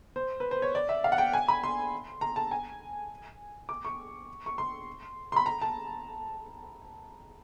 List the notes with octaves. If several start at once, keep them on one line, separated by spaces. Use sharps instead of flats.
C5
B4
C5
C#5
D5
E5
F5
F#5
G5
G#5
B5
C6
A#5
A5
G#5
D6
C#6
C#6
C6
C6
B5
A#5
A5